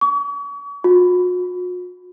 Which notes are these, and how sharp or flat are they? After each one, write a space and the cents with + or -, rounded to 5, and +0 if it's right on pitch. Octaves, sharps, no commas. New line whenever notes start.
C#6 +40
F#4 -45